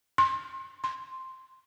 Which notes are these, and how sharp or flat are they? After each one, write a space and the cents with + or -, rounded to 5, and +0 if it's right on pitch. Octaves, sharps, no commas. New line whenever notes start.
C6 +25
C6 +5